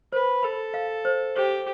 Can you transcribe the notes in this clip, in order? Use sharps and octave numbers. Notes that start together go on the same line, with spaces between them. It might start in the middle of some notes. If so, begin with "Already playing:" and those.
B4 C5
A4 B5
F5
C5
G4 C5